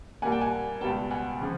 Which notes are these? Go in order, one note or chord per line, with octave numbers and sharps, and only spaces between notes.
A#2 G3 A#3 F#5 G#5
G5 A5
F#5 G#5
C#2 B2 G3 B3 G5 A5
F#5 G#5
C#3 F3